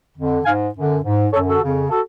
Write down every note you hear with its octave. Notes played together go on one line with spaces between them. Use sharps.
F2 D3
G#2 F5 G#5
F#2 D3
G#2
F#2 D3 A4 C#5
F#4 A4
F2 C#3
F#4 A4